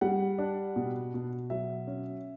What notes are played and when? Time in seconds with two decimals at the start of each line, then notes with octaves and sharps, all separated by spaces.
0.01 G3 F#5
0.38 D4
0.76 B2
1.14 B2
1.50 F#3 E5
1.87 C#4